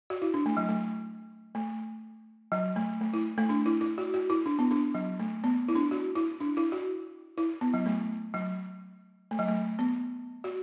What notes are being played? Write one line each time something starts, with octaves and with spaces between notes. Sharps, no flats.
F#4
E4
D4
A3
F#3
A3
A3
F#3
A3
A3
E4
A3
D4
E4
E4
F#4
F#4
E4
D4
B3
D4
F#3
A3
B3
E4
D4
F#4
E4
D4
E4
F#4
E4
B3
F#3
A3
F#3
A3
F#3
A3
B3
F#4